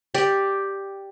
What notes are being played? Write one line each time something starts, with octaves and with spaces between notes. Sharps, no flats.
G4 D5